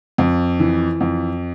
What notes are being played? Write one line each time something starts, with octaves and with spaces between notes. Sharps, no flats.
F2
E3
F2